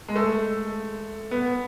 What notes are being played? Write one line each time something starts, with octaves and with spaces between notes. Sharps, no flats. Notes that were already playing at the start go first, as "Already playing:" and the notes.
G#3
A3
B3